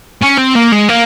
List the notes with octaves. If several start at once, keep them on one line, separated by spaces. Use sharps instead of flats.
C#4
C4
A#3
G#3
A#3